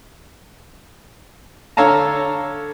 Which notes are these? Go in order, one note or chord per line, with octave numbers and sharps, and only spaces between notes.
D3 A4 C#5 F5 A5 A#5